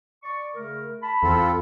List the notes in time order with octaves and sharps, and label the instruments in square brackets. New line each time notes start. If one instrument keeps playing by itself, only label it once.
[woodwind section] D5 C#6
C#3 A3 A#4
A5 B5
[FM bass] E2 [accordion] C4 F4 A4